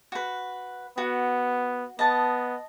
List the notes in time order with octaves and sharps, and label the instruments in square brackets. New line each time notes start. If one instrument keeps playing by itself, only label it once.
[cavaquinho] F#4 B4
[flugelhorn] B3 [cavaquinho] F#4
[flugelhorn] B3 [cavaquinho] D#5 A5